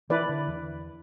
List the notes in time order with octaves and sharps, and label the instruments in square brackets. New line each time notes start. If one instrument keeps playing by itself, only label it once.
[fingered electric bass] E3 [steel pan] E4 B4 D5
[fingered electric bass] D3
E2